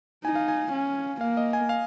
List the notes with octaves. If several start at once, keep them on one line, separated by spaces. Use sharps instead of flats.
D#4 G#5
F5
G#5
C#4
A#3 F5
D#5
G#5
F5